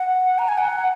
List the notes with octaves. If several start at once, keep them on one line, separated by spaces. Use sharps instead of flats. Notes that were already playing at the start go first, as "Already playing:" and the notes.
Already playing: F#5
A#5
G#5
F#5